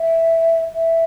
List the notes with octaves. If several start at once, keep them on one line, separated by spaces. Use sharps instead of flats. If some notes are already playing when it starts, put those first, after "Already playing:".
Already playing: E5
E5